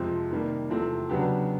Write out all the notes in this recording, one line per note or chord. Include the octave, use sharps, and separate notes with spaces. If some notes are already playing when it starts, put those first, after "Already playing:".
Already playing: F2 C3 F3 G#3 C4
C3 D#3 G3 A#3
E2 C3 F3 A3 C4
C#3 F#3 B3 D4 G4